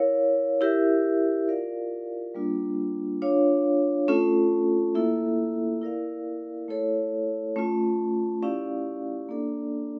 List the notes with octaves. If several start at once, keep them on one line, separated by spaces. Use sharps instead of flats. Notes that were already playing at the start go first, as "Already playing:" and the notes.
Already playing: E4 A#4 C#5 F5
E4 G4 A#4 E5
F4 A#4 D5 F5
G3 A#3 D4 F4
D4 F4 C#5 F5
A3 C#4 F4 A4
A#3 E4 A4 E5
E4 A#4 D5 F5
A3 E4 A4 C#5
A3 C#4 F4
C#4 E4 G4 D5 F5
A#3 D4 A4 D5